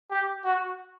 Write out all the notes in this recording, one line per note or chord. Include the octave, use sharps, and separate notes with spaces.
G4
F#4